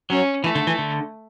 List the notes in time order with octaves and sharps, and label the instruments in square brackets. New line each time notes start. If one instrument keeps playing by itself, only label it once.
[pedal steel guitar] F#3 [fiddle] C#4
[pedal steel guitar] E3 [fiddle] A3
[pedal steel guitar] D3
E3
D3